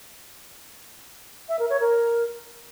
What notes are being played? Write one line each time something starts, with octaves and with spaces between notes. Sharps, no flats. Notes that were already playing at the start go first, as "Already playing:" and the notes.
E5
A#4
C#5
A#4